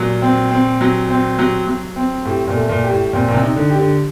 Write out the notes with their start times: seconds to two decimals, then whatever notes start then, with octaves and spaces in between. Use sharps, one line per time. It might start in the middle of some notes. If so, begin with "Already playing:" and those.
Already playing: A#2 F#3
0.22 C4
0.51 C4
0.81 F#3
1.10 C4
1.39 F#3
1.67 F#3
1.96 C4
2.25 A2 G4
2.48 A#2
2.54 A3
2.69 A#2
2.84 G4
2.91 A2
3.13 A#2 C4
3.28 A#2
3.34 C3
3.41 D#4
3.56 D3
3.70 G4
3.79 D3